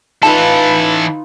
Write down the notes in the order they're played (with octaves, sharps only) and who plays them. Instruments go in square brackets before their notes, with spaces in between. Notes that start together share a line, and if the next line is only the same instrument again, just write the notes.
[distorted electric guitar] E3 A4 [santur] D#4 F4 [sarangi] B4 [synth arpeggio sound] A5